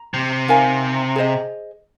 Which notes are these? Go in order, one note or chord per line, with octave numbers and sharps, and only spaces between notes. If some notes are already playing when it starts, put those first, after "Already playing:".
Already playing: A#5
C3
D#4 A#4 F5 G#5
G#4 C5 D#5